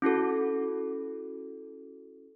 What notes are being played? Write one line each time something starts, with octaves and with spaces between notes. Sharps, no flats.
C#4 E4 F#4 A4